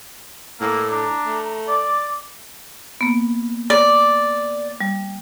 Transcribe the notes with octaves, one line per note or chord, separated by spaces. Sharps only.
A2 A#3 E6
D4 A#5
A3
D5 D6
A#3 B3
D5
G3